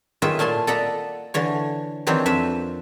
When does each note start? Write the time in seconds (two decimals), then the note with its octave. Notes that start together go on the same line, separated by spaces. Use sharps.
0.22 A2 D#3 F4 G#4 B4 E5
0.39 A#2 A3 G#5 A5 C6
0.67 A4 D5 D#5 F#5 A#5 B5
1.34 D3 E3 C#5
2.07 D#3 E3 F#3 C4 D4
2.26 F2 B4 E5